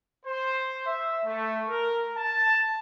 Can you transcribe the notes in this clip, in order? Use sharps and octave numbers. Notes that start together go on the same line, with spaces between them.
C5
E5
A3
A#4
A5